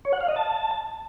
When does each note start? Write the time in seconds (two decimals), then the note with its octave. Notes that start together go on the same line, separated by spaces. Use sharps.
0.05 C#5
0.13 F#5
0.21 F5
0.28 D#5
0.36 A5